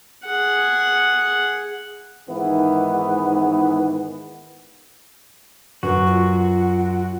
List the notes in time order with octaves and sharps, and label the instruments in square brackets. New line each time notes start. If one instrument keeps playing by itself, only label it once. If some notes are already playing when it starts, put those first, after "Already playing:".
[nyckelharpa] G#4 F#5
[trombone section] G#2 D#3 E3 B3
[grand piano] F#2 [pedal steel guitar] F#4 [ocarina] B4
[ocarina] F4